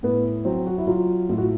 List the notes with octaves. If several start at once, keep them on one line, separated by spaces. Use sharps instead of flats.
A2 B3
F#3 C4
F#4
E4
F#3 F4
A2 F4
F#4